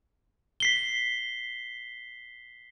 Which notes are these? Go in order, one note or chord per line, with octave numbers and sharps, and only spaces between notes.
B6 C7 G7